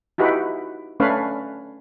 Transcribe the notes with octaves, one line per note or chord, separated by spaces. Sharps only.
D#4 E4 F#4 G4 B4
A3 C#4 D4 B4 C#5 F5